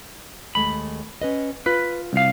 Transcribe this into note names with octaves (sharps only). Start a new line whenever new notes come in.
D#2 G#3 A3 B5
C#4 B4 D#5
F4 B4
C2 F5